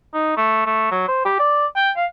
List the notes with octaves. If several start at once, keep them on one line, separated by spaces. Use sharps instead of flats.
D#4
A3
A3
F#3
C5
G4
D5
G5
F5